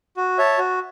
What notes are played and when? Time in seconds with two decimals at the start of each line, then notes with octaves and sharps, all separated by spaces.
0.17 F#4
0.38 C#5 E5 A5
0.58 F#4